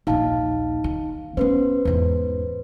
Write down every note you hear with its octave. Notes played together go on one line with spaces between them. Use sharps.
A#1 D#2 D#4 F5 A5
D#3
B3 C#4 B4 C5
E2 G#2